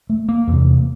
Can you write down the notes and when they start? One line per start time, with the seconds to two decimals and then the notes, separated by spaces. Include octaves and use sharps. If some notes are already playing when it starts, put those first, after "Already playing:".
0.10 A3
0.29 A#3
0.47 E2 C3